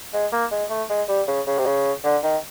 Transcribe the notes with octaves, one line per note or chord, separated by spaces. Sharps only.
G#3
A#3
G#3
A3
G#3
G3
C#3
C#3
C3
C#3
D3
D#3